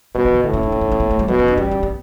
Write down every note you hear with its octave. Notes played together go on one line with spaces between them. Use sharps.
B2 G3
F#3
C#3
A2 D3
C#4
D4
C#4
D4
C#4
B3
A3
G3
B2 F#3
C#4
D4
G3 C#4
C#4
B3